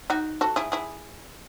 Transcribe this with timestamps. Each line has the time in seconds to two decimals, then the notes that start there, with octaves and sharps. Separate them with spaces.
0.10 D#4 F#4
0.41 F#4 A4
0.56 E4 G#4
0.72 E4 G#4